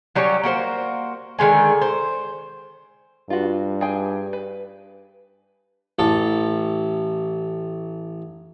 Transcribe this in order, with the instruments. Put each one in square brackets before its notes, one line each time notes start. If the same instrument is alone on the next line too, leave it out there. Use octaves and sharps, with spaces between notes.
[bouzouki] F#3 G3 C#4 C#5
A#3 F#4 A4 C5
D3 D#3 G#3 G#5
C5
[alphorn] G2 [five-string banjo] F4 F#4
[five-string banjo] G#4 G5
B4
[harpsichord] A1 A4